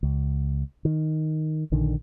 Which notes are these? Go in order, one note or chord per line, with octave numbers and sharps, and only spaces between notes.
C#2
D#3
A#1 D3 D#3